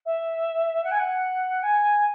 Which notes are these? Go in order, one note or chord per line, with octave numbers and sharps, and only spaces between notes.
E5
F#5
G#5
F#5
G#5